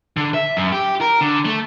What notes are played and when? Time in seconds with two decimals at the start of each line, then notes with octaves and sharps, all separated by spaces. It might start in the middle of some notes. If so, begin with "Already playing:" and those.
0.17 D3
0.34 E5
0.57 F#2
0.72 G4
1.01 A#4
1.21 D3
1.45 A3